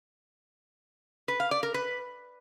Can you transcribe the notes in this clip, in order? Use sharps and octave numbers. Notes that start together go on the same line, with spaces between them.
B4
F5
D5
A#4
B4